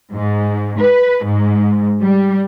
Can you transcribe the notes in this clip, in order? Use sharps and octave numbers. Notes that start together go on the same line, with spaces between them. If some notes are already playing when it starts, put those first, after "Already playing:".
G#2
B4
G#2
G3